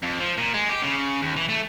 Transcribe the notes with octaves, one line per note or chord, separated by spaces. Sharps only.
F2
F3
A#2
G#3
G4
C#3
D#2
E3
A3